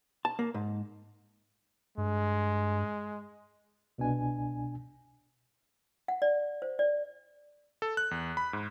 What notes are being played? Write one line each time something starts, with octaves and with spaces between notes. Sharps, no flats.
A5
A#3
G#2
G2 G#3
C2 B2 D4 G#5
F#5
D5
C5
D5
A4
F#6
E2
B5
G#2